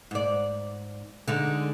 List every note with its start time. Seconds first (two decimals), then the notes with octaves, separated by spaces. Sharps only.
0.11 G#2 D5
1.28 D3 G#3 D#4